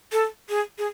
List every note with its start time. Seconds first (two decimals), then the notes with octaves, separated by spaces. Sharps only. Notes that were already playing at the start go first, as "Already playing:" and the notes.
0.12 A4
0.49 G#4
0.78 G#4